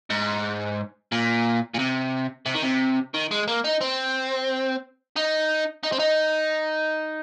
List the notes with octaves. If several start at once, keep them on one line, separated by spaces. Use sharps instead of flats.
G#2
A#2
A#2
C3
C3
D#3
C3
D#3
G#3
A#3
D#4
C4
D#4
D#4
C4
D#4